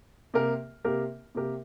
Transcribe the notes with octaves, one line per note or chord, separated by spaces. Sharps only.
C3 A#3 G4 A#4
C3 A#3 G4 A#4
C3 A#3 G4 A#4